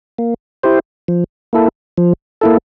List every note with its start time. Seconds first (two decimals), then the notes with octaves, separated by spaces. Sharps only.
0.19 A#3
0.63 E4 G4 C5
1.08 F3
1.53 A#3 E4 A4
1.98 F3
2.41 A#3 E4 A4